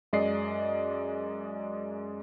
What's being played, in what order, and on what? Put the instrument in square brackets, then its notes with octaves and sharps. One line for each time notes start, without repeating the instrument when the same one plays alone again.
[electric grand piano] F#2 G#3 D5 D#5 C7